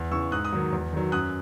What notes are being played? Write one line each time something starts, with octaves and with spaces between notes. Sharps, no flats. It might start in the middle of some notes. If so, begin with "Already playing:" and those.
Already playing: E2
C#3 E3 C#6 E6
G#2 D#6 F#6
D#6 F#6
D#3 F#3
E2
D#3 F#3
F#2 D#6 F#6